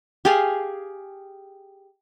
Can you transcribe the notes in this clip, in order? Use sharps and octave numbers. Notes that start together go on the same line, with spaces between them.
G4 G#4 F5